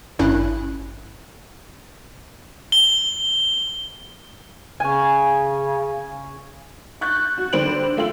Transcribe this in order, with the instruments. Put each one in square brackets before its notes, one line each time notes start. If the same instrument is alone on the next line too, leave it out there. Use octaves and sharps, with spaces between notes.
[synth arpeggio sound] G#1 G2 C#4 E4 F#6
[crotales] G7
[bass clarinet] C#3 [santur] C#4 G#5
[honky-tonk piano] C#6 F#6 G6 A6
F#4
D3 G3 C5 D7 F#7
A3 F4 G5 E6 F#7